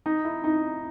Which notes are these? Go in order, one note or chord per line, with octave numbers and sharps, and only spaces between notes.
D#4
E4
D#4